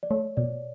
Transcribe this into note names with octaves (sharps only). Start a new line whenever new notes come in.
D5
A3 C#5
B2 D5